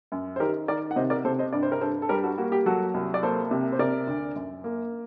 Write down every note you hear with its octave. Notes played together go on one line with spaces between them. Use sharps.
F#2
C5
D#3 G4 A#4
D#3 A#4 D5
F#5
C3 C5 D#5
A#4 D5
C3 A4 C5
C5 D#5
G2 D5
C5
A#4
G2 A4 C5
A4
G3 G4 A#4
F#4 A4
A#3 F#4
G4
F#3 F#4 A4
C2
D5
A#3 A4 C5
C3
C5
C3 A#4 D5
D2
F#2
A#3